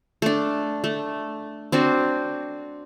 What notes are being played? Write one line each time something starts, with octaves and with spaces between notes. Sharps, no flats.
A3 D4
A3
C4 D4 F#4